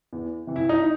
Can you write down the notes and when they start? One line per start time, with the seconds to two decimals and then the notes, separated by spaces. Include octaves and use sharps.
0.13 E2
0.47 C3 E3
0.56 E4
0.69 D#4